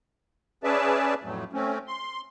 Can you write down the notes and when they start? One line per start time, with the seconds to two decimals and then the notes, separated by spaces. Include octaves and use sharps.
0.64 C#4 G#4 B4 D5 E5 A5
1.24 F2 A2 F#3 A3
1.53 A3 C4 C#4
1.88 C6